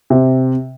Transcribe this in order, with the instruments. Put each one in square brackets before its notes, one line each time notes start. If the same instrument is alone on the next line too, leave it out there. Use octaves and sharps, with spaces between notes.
[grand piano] C3